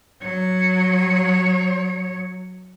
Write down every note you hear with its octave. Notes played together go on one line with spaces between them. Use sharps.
F#3 C#5